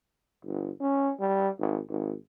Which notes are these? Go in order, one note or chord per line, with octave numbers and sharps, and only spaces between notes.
G1
C#4
G3
G#1
G#1